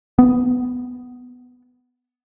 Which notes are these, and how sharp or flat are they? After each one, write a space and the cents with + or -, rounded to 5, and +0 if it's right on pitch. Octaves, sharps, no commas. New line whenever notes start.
B3 +10